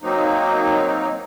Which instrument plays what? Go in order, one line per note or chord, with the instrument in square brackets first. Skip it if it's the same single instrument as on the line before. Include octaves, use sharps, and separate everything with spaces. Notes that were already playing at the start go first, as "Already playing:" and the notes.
[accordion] F#3 A#3 C4 D#4